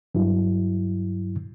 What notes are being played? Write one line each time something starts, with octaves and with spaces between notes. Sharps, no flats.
G2 F#3 E4